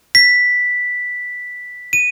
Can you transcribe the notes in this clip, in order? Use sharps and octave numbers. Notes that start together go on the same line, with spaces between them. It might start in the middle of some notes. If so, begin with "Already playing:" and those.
B6
D#7